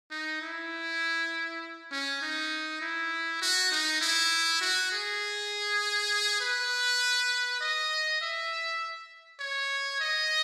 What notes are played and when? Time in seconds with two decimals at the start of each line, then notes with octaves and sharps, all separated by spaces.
0.11 D#4
0.42 E4
1.91 C#4
2.22 D#4
2.81 E4
3.41 F#4
3.72 D#4
4.01 E4
4.61 F#4
4.92 G#4
6.41 B4
7.61 D#5
8.21 E5
9.40 C#5
10.00 D#5